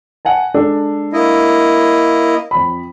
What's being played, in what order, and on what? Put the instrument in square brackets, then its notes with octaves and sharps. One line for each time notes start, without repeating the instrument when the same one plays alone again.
[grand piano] F#5 G#5 A5
G#3 D4 A4
[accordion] A#3 E4 D#5
[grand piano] F2 B5